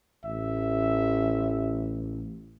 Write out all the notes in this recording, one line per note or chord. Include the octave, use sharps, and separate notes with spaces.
A1 E5